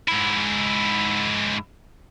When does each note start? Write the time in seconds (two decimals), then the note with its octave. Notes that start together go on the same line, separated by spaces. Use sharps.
0.08 G#2 E4